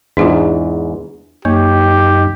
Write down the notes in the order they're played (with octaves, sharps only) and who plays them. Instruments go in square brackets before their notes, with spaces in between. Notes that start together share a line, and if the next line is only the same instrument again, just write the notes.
[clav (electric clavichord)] E2 G#2 [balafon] D4 E4 F4
[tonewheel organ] F#2 D#4 [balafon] A#3 [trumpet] G4 [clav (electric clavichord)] C#5